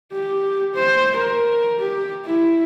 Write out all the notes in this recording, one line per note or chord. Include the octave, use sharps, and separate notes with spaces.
G4
C5
A#4
G4
E4